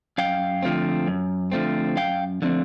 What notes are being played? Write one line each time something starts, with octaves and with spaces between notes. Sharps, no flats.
F#2 F5 G5
D3 F3 A3 C4
F#2
D3 F3 A3 C4
F#2 F5 G5
D3 F3 A3 C4